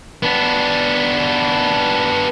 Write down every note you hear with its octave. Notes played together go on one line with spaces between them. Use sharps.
B3 D4